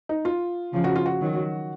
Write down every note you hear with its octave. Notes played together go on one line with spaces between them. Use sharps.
D#4
F4
C#3 F3
F#4
F4
F#4
D#3 F#3